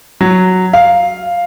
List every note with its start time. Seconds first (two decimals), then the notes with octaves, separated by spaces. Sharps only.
0.21 F#3
0.73 F5